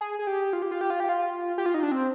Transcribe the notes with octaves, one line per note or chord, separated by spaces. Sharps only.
G#4
G#4
G4
F4
G4
F4
G4
F4
G4
F4
G4
F4
D#4
D4
C4